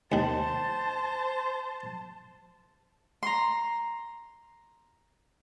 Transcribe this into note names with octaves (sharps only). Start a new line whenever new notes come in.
D#2 D#3 C5 A5
A#5 C6